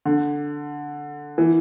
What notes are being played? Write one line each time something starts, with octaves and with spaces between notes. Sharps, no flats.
D3
E3